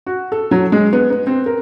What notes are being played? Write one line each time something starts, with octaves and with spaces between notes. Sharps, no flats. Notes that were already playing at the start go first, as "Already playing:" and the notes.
F#4
A4
F#3
G#3
B3
B3
C4
A#4